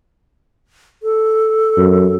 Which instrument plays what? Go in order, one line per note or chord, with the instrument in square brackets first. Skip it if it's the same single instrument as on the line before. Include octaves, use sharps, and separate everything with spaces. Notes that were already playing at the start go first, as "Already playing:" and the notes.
[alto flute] A4
[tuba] F#2